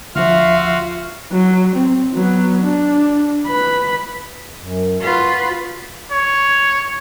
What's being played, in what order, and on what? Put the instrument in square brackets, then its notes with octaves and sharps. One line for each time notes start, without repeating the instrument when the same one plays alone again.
[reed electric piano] D2 F3 [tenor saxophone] F4 [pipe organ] F#4 F5 [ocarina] E5
[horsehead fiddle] F#3
C4
F#3 B3
D4
B4 B5
[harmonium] F#2
[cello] F4 B4 [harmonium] F#4
[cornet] C#5